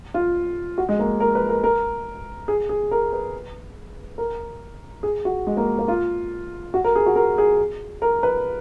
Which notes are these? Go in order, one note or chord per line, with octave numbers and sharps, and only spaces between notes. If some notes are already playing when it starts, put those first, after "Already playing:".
F4
F#4
G#3
A#3
A#4
B4
A#4
A#4
G#4
G#4
A#4
B4
A#4
G#4
F#4
G#3
A#3
A#3
F4
F#4
A#4
G#4
F#4
A#4
G#4
A#4
B4